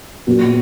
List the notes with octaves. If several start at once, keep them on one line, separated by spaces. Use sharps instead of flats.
A#2 F#3 B3